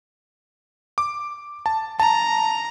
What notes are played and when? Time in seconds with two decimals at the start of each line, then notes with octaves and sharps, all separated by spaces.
0.98 D6
1.66 A5
2.00 A5 A#5